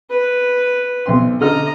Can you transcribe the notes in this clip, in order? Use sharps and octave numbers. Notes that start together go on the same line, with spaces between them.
B4
B1 C4 C6
D3 A4 D#5 A#5 F6